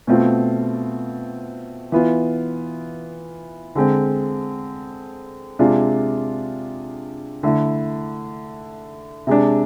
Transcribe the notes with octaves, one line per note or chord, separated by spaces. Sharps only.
B2 A3 C4 F4
E3 B3 F4
D3 G#3 C4
C3 G#3 D4 F4
D3 A3 E4
C3 G#3 D4